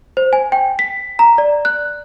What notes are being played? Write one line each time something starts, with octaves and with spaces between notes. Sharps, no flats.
C5
G#5
G5
B6
A#5
D5
F#6